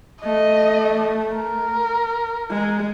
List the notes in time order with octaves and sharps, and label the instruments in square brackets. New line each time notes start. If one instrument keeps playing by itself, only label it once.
[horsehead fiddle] A3 [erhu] D#5
[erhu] A#4
[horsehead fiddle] G#3